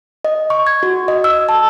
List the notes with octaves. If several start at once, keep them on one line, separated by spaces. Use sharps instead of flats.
D#5
C#6
G#6
F#4
D#5
E6
A5